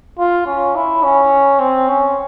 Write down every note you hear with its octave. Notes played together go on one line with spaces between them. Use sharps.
F4
C#4
E4
C#4
C4
C#4